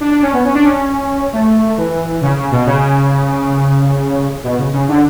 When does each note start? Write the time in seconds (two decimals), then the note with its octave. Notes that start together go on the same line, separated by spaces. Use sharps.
0.01 D4
0.11 D4
0.22 C#4
0.33 B3
0.45 C#4
0.54 D4
0.64 C#4
1.33 A3
1.78 E3
2.22 C#3
2.37 C#3
2.52 B2
2.66 C#3
4.44 B2
4.59 C#3
4.73 C#3
4.88 D3